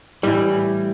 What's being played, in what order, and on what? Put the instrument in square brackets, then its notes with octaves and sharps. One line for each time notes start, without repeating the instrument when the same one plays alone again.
[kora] A2 E3 [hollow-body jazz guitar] G3